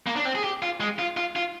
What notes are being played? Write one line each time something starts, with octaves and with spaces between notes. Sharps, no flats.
A#3
D4
C4
G#4
G4
F4
G#3
F4
F4
F4